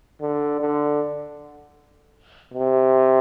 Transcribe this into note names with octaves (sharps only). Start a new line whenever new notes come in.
D3
D3
C3